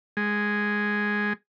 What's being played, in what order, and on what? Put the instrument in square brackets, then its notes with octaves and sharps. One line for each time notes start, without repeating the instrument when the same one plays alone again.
[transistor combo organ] G#3